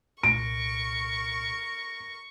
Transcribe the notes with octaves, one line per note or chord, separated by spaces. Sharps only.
C2 A#2 A#4 C#6 D7